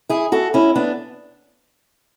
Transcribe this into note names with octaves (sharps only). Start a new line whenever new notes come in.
E4 G#4
F#4 A4
C#4 E4
B3 D4